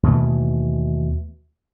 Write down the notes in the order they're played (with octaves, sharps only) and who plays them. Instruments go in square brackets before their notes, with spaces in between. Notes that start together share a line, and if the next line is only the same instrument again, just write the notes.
[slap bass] D#2 B2 E3 A3